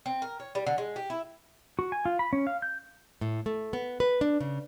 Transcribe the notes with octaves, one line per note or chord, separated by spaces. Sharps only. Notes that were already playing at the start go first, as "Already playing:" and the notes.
C4
A#4
C#5
G3
D3
G#3
G4
E4
F#4
G#5
F4
B5
C#4
F5
G6
A2
A3
B3
B4
D4
C#3